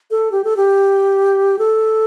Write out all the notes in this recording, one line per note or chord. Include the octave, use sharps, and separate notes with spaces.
A4
G4
A4
G4
A4